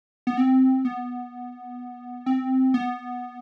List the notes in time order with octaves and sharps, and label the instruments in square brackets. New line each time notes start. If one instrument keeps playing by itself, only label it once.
[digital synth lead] B3
C4
B3
C4
B3